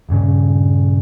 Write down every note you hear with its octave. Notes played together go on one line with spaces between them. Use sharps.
D#1 G2 C#3